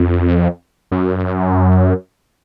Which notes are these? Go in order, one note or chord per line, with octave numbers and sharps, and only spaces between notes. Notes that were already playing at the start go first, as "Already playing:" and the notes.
Already playing: F2
F#2